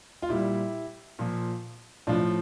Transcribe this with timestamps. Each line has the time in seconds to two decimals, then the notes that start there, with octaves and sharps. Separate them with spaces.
0.22 F4
0.29 A#2 G3 E4 G4
1.19 A#2 F3
2.07 A2 F3 D4 F4